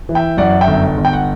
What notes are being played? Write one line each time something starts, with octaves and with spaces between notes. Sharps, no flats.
E3
E5 G5
F#2 D5 F#5
E5 G5
G1
G1
G5
F#5